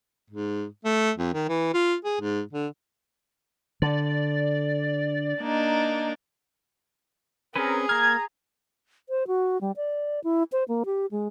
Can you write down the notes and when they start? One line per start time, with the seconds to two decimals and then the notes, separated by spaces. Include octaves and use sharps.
0.30 G#2
0.85 A3
1.17 F2
1.34 D#3
1.49 E3
1.74 F4
2.04 G#4
2.21 G#2
2.53 D3
3.82 D3 D5
5.40 A#3 D4 D#4
7.56 C4 C#4 G#4 A#4 B4
7.89 A#3 A#5 F6 G#6
9.09 C5
9.27 F#4
9.61 G3
9.77 D5
10.24 E4
10.52 C5
10.68 A#3
10.85 G4
11.11 G#3